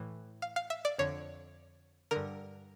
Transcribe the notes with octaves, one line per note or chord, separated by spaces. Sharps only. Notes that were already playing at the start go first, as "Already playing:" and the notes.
Already playing: A2 E3
F5
F5
E5
D5
F2 D3 C#5
G2 D3 A#4